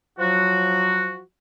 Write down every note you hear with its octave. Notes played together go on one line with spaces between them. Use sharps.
F3 F#3 F#4